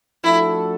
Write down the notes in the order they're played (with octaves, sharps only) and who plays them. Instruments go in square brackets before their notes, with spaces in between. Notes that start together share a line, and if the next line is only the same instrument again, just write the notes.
[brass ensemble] F3 A3 D4 F#4 A4 [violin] E4